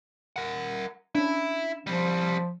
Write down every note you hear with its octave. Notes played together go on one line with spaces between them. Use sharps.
A#4 F#5
C#4 D4 E4
F3 G3 C4